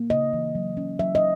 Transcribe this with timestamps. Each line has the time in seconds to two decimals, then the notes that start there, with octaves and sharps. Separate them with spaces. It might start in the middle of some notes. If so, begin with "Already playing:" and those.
Already playing: A#3
0.10 C#3 D#5
0.33 E3
0.55 F#3
0.77 C#4
0.99 F#3 E5
1.15 D#5